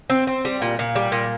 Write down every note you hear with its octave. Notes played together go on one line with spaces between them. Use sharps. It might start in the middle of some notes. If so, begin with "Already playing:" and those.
C4
C4
G3
A#2
A#2
G3
A#2